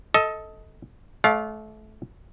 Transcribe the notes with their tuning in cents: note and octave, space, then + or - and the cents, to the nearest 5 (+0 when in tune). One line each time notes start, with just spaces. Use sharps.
A4 +0 D#5 +20
A3 -30 D5 -30 F5 +15